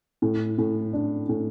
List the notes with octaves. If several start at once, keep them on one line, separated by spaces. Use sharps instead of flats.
A2
A2
D4
A2